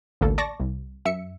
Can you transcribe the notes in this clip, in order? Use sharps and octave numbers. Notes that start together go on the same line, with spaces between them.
A1 D2 A#3 A4
D5 A5 C#6 D6 A#6
C2
F#2 E5 C#7